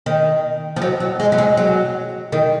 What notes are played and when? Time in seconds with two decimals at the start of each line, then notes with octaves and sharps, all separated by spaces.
0.06 D#3
0.76 F3
0.82 F#3
1.00 F#3
1.20 G#3
1.32 F#3
1.38 G#3
1.57 F#3
2.32 D#3